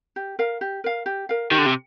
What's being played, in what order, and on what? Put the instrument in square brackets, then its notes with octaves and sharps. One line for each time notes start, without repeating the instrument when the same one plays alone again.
[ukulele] G4
A#4 F5
G4
A#4 F5
G4
A#4 F5
[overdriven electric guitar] D#3 [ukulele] G4
[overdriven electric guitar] D3
C3